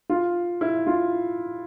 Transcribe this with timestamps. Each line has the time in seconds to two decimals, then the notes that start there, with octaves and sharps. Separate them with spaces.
0.10 F4
0.61 E4
0.87 F4